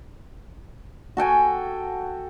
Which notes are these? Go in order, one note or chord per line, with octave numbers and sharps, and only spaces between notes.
F#4 A4 G5 G#5